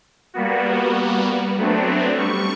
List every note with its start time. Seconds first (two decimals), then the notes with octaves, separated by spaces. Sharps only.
0.34 G3 A#3 B3 F#4
1.57 F#3 A3 B3 C4 D4
2.17 G3 C#6